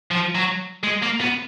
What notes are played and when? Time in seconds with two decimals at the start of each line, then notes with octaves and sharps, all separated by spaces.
0.11 F3
0.35 F#3
0.84 G#3
1.03 A#3
1.21 B3